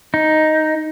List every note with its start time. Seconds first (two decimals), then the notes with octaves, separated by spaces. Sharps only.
0.14 D#4